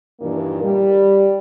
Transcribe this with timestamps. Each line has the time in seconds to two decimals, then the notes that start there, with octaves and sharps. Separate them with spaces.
0.20 G2 A#2 D#3 E3 A#3
0.63 G3